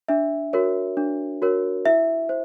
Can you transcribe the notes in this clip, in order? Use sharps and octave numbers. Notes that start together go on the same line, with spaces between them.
D4 E5
F#4 A#4 C#5
D4
F#4 A#4 C#5
E4 E5
C5